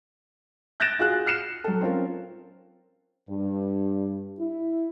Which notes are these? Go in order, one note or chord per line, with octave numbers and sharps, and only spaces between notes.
F#6 G6 A6 A#6 D7 E7
F4 F#4 G#4 F#6
F6 C7 C#7 E7
F#3 A4
C4 C#4 F4 A#4
G2
E4